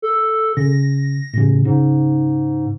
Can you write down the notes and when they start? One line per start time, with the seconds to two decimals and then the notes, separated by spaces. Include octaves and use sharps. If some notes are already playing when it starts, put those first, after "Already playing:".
0.02 A4
0.57 C#3 A#6
1.33 A2 C#3
1.65 G#2 C#3